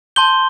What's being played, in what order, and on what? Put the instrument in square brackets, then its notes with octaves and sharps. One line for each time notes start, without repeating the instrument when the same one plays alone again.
[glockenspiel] A5 C6 G6 G7